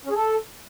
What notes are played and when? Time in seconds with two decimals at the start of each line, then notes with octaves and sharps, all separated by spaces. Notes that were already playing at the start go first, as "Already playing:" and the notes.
0.05 C#4
0.10 G#4
0.15 A4